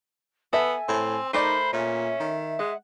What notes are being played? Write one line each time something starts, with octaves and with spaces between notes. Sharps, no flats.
B3 A4 E5 G#5
A2 C4
A3 D#4 A#4 C5 D5 B5
A#2 C#4 E5
D#3
G#3 F#5